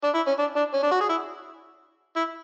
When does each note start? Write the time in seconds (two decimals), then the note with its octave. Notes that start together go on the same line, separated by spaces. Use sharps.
0.04 D4
0.15 E4
0.27 C#4
0.39 D4
0.56 D4
0.74 C#4
0.83 D4
0.91 F#4
1.01 G#4
1.09 E4
2.16 E4